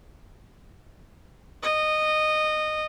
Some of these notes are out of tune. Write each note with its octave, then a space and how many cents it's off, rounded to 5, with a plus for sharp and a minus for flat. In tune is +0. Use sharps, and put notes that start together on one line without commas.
D#5 -15